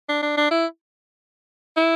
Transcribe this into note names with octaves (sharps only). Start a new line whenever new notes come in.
D4
D4
D4
E4
E4